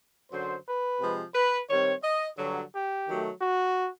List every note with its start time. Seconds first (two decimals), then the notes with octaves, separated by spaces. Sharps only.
0.32 F#2 D3 F#3 C5
0.67 B4
1.00 C3 F3 G#3
1.35 B4
1.69 D#3 G3 C4 C#5
2.03 D#5
2.38 G2 D3 F#3
2.73 G4
3.07 D#3 F#3 A3
3.41 F#4